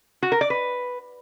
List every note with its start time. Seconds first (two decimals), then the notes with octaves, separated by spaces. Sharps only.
0.23 F#4
0.32 A#4
0.41 D5
0.50 B4